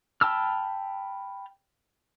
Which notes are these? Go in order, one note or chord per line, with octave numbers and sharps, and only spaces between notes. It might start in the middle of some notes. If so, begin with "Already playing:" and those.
G5 A5 B5 E6 F6